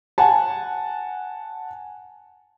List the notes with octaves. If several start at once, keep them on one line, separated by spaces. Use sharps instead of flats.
F#5 G#5 A5